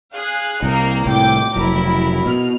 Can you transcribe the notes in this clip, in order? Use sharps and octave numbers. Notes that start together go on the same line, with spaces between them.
G#4 F5 F#6
C2 A#3 D#4 A#4
C2 A2 G5 D6
F1 F#3 E4 A#4
B2 F6